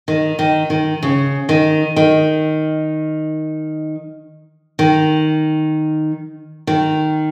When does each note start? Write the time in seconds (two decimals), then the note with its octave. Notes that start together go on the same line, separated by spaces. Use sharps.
0.08 D#3
0.39 D#3
0.70 D#3
1.03 C#3
1.49 D#3
1.96 D#3
4.79 D#3
6.67 D#3